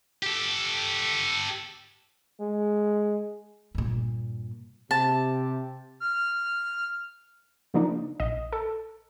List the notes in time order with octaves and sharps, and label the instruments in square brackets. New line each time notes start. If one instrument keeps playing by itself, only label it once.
[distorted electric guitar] G4 A4
[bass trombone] G#3
[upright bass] G2 A#2
[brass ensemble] C3 G4 [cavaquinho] A5
[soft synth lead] F6
[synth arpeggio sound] C#3 F3 A#3 D4 D#4
A#1 D#5
A4